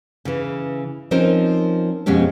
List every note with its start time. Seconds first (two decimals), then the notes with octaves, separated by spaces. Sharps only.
0.25 C#3 E3
1.11 F3 C4 C#4 D#4 A#4
2.06 F2 B2 G#3 C#4 G4